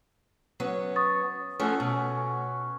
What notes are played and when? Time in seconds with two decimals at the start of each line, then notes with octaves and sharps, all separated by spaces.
0.60 F#3 B3 C#4
0.96 C#6 D#6 A6
1.60 F3 A3 C#4 F#4 A4
1.80 B2